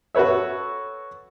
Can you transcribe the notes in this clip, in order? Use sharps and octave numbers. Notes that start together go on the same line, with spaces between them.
F#4 A4 B4 C#5 E5